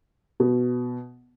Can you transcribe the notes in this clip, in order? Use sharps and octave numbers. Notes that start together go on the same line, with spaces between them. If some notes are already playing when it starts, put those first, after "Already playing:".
B2